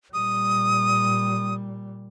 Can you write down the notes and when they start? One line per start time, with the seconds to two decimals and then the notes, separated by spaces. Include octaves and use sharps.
0.14 A#2 G3 D#6